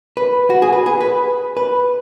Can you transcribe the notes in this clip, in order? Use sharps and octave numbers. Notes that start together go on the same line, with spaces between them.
B4
F#4
G#4
B4
G#4
B4
B4